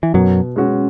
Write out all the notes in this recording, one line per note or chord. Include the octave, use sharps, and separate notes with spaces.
E3
F#2 B2 F#3
G#3 C#4 F#4